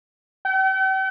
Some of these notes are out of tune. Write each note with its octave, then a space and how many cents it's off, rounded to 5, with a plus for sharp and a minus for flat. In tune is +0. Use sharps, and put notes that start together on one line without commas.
G5 -45